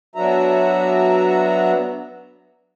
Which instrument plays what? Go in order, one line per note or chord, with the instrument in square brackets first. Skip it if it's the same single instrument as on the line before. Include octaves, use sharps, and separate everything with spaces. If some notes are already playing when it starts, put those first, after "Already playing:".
[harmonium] F#3 B3 D4 F#4 E5 A#5